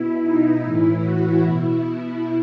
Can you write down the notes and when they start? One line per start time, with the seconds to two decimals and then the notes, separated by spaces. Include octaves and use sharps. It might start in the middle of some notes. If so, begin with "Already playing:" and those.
Already playing: B2 E4
0.22 D#4
0.62 A2 E3 E4
1.02 F#4
1.42 B2 E4